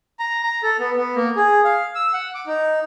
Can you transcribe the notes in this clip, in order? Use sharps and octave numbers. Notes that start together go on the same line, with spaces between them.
A#5
A#5
A4
B3
B3
A#3
G#4
F5
E6
F#5
D6
D#4